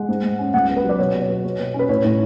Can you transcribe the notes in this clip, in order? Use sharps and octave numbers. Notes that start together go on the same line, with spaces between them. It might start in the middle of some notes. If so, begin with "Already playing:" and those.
Already playing: G#3 F#5
G#2
G#2
C#4
C#2 F#5
B3
B4
F#3
D5
B2 C#5
B2
C#5
B3
B2
B2
C#4
B4
A2 C#5
A2